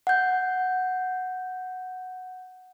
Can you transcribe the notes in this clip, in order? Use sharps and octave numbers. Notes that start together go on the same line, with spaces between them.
F#5 G6